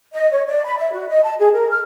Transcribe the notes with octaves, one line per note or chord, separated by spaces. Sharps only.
D#5
C#5
D5
B5
E5
F#4
D#5
A5
G#4
A#4
F6